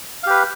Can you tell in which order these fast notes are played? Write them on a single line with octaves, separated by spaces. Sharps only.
F5 G4 B4